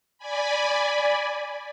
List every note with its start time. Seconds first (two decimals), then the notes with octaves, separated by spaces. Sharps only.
0.18 D5 G#5 B5